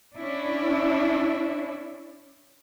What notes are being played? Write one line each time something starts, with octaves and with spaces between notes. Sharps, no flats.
C#4 D4 E4